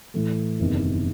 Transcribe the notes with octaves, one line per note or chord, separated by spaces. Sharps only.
A2 E3 A3
F#1 E2 C3 D#3